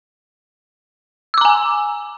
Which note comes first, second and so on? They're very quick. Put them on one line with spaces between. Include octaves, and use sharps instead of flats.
E6 D6 A#5 G#5